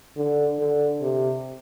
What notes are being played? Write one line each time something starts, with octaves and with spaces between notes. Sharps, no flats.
D3
D3
C3